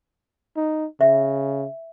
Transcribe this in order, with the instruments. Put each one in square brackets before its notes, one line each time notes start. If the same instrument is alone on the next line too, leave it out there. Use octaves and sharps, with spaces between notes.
[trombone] D#4
[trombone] C#3 [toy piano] E5